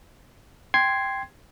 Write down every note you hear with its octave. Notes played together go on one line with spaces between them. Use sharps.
G5 C6 G#6 C7